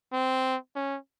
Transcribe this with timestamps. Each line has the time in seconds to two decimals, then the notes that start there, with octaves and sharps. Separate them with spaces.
0.12 C4
0.75 C#4